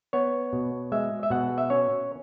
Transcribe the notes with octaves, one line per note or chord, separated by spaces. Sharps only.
B3 C#5
B2
G#3 E5
E5
B2 F#5
E5
C#4 C#5